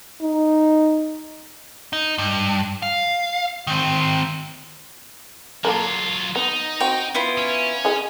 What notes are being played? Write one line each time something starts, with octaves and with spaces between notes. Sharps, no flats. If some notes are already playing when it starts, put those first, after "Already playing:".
D#4
D#4
G2
F5
D#3 C4
F#3 A#3 F4 A4 A#4
B3 D#4
C4 F#4 G5
B3 E4 F4
C#4
E4 G#4 D#5